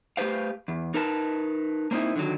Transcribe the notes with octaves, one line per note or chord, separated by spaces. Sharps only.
A3 G4 B4 C5 F5
E2
D#4 A#4 B4 A5
A#3 C4 D#4 E4
D3 D#3 F#3